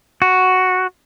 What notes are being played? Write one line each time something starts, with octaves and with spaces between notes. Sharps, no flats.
F#4